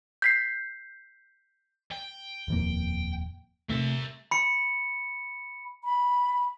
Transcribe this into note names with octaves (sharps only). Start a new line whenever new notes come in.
G6 B6 C7
G5
D#1 F2 A#3
C3 A3 A#4 E5
B5 C#7
B5